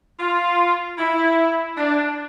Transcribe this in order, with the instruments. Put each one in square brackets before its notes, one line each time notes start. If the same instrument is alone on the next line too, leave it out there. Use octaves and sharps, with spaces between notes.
[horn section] F4
E4
D4